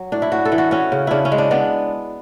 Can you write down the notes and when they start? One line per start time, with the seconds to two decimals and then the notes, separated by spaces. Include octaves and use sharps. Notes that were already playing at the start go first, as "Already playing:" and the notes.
Already playing: F#3
0.12 A2 D4
0.22 E4
0.31 A2 F#4
0.45 A4
0.52 E3
0.58 F#4
0.71 C#4 F#4
0.92 C#3
1.07 C#3 D4 E4
1.25 C#4
1.32 G#3
1.38 D4
1.51 B3 D4